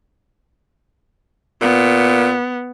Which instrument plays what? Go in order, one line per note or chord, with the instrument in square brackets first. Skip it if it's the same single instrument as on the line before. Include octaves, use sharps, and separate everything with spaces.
[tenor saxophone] A#2 [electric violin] B3